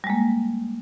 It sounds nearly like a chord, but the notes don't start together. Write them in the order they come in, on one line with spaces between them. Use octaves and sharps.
G3 G#3 A#3